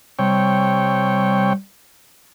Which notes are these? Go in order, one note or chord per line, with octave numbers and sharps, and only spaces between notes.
C3 G3 C#5 G5